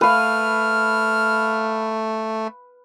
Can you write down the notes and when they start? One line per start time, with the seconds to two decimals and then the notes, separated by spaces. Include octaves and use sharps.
0.01 A3 B4 F5 F6